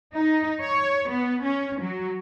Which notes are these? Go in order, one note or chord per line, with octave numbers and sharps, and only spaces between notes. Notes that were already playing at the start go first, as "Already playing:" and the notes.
D#4
C#5
B3
C#4
F#3